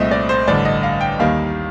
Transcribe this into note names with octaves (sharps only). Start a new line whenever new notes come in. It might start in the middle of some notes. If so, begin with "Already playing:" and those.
Already playing: C2 A#2 A3 C4 D#5
D5
C5
A1 G2 D3 D5
D#5
F5
G5
D#2 D#3 G3 A#3 F5